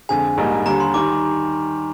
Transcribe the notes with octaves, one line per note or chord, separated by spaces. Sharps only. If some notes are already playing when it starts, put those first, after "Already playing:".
F2 D3 G#3 G#5
A#1 G#2 G3 A#3 D#4
D#2 D3 G3 A#5
C6
D#3 G3 D6